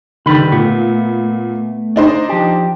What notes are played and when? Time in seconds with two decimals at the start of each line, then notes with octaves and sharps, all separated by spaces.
0.26 D3 D#3 G3 B4 B5
0.52 A#2 A3 B3
1.96 D4 D#4 C5
2.29 F3 G4